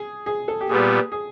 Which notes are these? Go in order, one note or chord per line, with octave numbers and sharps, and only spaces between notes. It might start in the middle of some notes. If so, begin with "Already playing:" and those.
Already playing: G#4
G#4
A4
G4
A#2 G3 B3 G#4
G#4